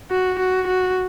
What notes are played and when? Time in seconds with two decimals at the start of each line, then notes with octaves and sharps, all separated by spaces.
0.11 F#4
0.39 F#4
0.68 F#4